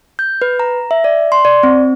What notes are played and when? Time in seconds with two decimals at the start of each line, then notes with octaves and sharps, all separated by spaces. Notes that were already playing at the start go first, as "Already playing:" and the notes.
0.19 G6
0.42 B4
0.60 A#5
0.91 E5
1.04 D5
1.32 C6
1.45 D5
1.63 C4